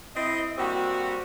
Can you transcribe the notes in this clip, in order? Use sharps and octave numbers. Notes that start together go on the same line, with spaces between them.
C4 E4 D#5
G3 A#3 C4 F#4